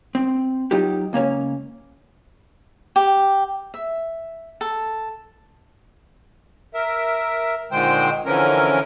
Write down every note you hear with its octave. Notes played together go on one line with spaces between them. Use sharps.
C4
F#3 D#4 F4 G4
C#2 A#3 C#4 C#5
G4
E5
A4
A#4 E5
A#2 D3 D#3 G#3 C5 G5
D3 E3 F3 C#4 A#4